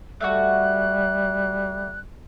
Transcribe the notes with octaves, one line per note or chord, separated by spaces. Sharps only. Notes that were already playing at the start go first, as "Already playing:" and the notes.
G3 A3 E4 F#4 F#6